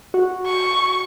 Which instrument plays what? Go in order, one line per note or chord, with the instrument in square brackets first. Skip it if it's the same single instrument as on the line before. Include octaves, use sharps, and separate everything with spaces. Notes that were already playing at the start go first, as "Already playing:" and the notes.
[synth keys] F#4
[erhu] C#6